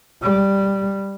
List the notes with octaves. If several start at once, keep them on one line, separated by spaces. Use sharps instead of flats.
G3